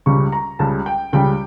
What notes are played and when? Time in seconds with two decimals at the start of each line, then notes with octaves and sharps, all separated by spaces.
0.06 C#2 C#3 G3 C#6
0.32 A#5
0.59 C#2 C#3 G3 A5
0.86 G5
1.13 C#2 C#3 G3 G5